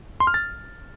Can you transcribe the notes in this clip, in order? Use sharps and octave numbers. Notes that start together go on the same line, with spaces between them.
C6
F6
A6